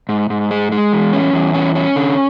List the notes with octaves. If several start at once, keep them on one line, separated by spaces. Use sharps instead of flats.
G#2
G#2
G#3
G#3
E2
C#4
E2
C#4
C#4
D3